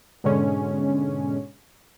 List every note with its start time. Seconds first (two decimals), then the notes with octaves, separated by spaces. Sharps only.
0.24 G#2 B2 D3 G#3 C#4